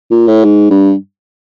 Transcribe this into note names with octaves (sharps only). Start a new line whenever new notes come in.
A#2
A2
G#2
G2